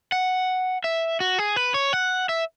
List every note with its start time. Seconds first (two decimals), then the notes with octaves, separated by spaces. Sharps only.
0.12 F#5
0.84 E5
1.20 F#4
1.39 G#4
1.56 B4
1.74 C#5
1.93 F#5
2.29 E5